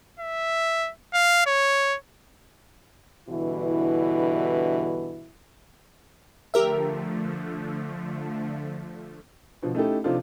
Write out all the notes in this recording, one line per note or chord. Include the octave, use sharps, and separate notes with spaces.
E5
F5
C#5
G2 B2 D3 E3 E4
D3 F3 A3 G4 A#4 E5
B2 D3 F3
A3 C#4 D#4 E4 G4 A4
C3 F3 D4 D#4 F4 A4